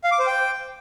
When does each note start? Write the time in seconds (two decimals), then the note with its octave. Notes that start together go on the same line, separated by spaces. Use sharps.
0.04 F5
0.11 D6
0.19 C5
0.27 G5